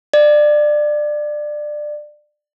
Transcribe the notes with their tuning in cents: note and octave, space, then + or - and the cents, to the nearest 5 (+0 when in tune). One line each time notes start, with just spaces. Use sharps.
D5 +20